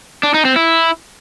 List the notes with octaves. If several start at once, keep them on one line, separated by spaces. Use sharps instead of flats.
D4
D#4
C4
E4